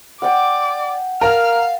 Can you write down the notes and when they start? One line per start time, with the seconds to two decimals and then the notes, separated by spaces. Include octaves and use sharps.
0.22 D5 F#5 G5 D6
1.21 A#4 F5 A5 A#5 F6